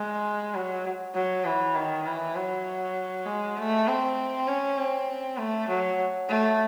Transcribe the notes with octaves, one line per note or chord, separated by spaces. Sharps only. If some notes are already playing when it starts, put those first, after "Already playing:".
Already playing: G#3
F#3
F#3
E3
D#3
E3
F#3
G#3
A3
C4
C#4
C4
A3
F#3
A3